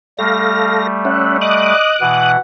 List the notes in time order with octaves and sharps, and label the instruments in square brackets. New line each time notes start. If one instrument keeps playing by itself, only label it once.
[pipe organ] G3 A3 [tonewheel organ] A4 F5 A#6
[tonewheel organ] C#4 E5 F#5
[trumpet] D#5 [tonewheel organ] D6 D#6 F#6
[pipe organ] B2 E3 [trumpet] F#5